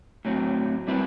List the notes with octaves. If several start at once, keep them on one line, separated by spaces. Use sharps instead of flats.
A2 F#3 C4
G3 C4 E4 B4